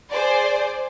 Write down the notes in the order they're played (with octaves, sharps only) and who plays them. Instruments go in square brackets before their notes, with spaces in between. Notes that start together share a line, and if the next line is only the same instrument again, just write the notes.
[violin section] G#4 C5 D5